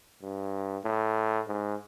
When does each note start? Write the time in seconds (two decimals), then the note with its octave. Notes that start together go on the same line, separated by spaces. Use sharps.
0.22 G2
0.85 A2
1.47 G#2